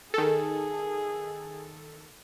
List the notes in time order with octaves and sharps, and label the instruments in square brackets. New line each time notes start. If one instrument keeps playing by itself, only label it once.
[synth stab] D#3 A4 [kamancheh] G#4